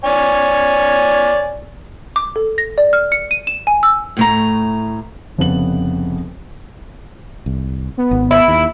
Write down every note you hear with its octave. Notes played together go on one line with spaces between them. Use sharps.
C#5 D5 G#5
D6
A4
A#6
D5
F6
C#7
D#7
E7
G#5
E6
A2 A3 A#5
F1 F2 C#3 B3 B4 F#7
C2
B3
G#1
E4
D#2 E5